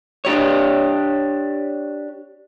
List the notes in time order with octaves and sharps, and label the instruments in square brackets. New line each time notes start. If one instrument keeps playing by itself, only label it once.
[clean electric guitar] D4 G4 C#5